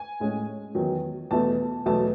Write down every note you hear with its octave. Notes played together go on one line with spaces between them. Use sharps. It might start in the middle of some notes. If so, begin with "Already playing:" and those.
Already playing: G#5
A2 G#3 C#4
E2 D#3 F#3
E2 B2 A3 A5
E2 B2 F#3 A3 A5